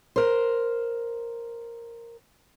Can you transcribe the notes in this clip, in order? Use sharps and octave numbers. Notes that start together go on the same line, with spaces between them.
A#4 C5